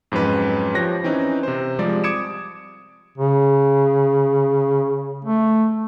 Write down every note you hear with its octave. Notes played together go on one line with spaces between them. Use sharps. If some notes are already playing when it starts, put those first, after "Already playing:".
F2 G#2 F#3 C#4 B4
F3 G4 C#5 F#6 A#6
E3 C4 C#4 D#4
C3 C5
F3 G3 G#3 C4 D5
D6 D#6 G#6 C#7 D7 E7
C#3
A3